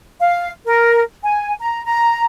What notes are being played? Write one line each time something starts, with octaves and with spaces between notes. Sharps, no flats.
F5
A#4
G#5
A#5
A#5